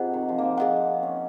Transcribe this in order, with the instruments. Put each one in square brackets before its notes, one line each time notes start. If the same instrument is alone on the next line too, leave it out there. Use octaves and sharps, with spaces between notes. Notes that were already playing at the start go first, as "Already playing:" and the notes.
Already playing: [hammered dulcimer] C3 [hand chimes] F4 G#4 D#5 F#5
[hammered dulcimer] D#3
F3
A#3 C4
[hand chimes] G#4 D#5 F#5
[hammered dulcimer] C#4